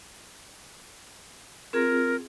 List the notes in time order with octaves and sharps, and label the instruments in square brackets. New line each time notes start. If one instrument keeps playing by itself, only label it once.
[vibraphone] C4 F4 G#4 [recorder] A#4